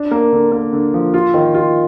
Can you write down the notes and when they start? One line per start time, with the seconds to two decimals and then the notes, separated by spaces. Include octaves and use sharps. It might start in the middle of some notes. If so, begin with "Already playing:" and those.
Already playing: D4
0.11 A#3
0.32 D3
0.52 A#3
0.73 D3
0.94 F3
1.14 F4
1.34 D#3
1.54 F4